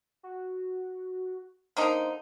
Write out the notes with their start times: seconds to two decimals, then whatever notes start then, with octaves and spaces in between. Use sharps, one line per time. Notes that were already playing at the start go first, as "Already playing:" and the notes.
0.23 F#4
1.77 D3 A#3 D#4 C5